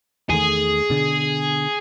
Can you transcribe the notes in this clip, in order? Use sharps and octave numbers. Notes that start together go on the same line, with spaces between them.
E2 D#3 A3 G#4
B2 D3